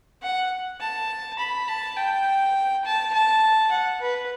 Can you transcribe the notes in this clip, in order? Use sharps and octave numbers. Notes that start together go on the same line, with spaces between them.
F#5
A5
B5
A5
G5
A5
A5
F#5
B4